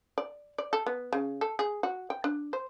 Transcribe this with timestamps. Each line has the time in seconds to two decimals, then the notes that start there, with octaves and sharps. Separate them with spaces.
0.18 D5
0.58 D5
0.73 A4
0.86 B3
1.13 C#3
1.41 A4
1.59 G#4
1.83 F#4
2.10 G5
2.24 D4
2.53 C5